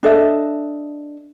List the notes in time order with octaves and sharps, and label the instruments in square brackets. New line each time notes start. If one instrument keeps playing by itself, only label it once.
[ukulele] D4 A4 D#5 E5